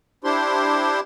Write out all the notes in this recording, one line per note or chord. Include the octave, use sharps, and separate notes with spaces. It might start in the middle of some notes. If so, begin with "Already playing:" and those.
D4 E4 G4 C5 C6